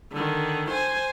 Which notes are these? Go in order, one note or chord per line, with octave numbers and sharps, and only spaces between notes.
D3 D#3
C5 G#5